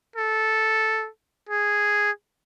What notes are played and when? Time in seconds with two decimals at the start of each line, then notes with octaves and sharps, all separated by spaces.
0.16 A4
1.49 G#4